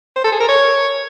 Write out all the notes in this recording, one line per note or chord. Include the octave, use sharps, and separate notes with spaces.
C5
A4
G#4
A#4
C#5